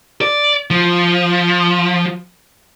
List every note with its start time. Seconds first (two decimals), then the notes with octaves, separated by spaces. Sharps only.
0.21 D5
0.70 F3